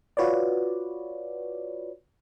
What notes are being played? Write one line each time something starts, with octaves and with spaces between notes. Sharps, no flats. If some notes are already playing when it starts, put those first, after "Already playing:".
F4 F#4 B4 C#5 D5